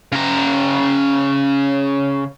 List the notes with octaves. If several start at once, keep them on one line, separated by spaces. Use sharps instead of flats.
C#3 A#5